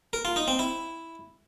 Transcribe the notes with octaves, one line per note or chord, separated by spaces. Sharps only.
A#4
F4
D#4
C4
E4